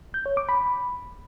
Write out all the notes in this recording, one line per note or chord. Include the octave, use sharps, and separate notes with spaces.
G6
C#5
D6
B5